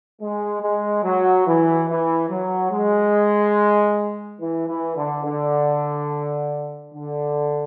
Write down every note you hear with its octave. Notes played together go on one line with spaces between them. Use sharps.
G#3
G#3
F#3
E3
E3
F#3
G#3
E3
E3
D3
D3
D3